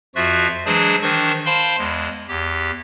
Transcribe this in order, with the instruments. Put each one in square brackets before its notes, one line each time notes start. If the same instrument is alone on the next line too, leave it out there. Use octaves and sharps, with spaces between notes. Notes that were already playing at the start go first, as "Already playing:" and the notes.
[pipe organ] F2 F3 F4 F#4 E5 F#6
E3 F#3 G#3 D4 G#4 C5
D#3 E3 D4 C5 C#6
C5 F5 G5 A5 B5 C6
E2 G#3
E2 G4